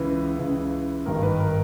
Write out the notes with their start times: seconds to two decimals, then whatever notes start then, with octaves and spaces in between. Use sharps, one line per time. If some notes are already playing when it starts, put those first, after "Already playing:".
Already playing: C#2 C#3 E3 B4
0.37 C#2 C#3 E3
1.06 G#1 G2 D#3 A#4
1.23 B4
1.40 A#4